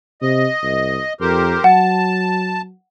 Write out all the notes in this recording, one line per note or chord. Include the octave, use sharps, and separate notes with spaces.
C3 D#5
C2
F2 G4 A#4 C5
F#3 F#5 A5